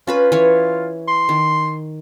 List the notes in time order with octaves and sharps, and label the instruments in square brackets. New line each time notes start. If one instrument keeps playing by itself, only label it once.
[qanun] C#4 B4 B5 [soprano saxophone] F4
[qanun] E3 C#5
[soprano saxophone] C6
[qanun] D#3